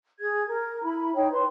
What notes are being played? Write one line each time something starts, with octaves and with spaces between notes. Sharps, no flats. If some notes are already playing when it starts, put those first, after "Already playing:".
G#4 G#6
A#4
E4 B5
D#4 C#5 G5
B4 C6